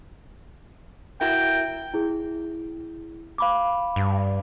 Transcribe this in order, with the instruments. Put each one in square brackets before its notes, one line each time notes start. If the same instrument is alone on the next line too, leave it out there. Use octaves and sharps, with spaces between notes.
[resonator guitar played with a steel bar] E4 F#4 A#4 [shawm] G5
[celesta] E4 G#4
F5 B5 D6
[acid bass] G2